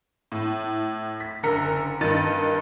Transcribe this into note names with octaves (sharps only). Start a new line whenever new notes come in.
A2
B6
F#1 D3 A#4 C#7
G2 D#3 A6 D#7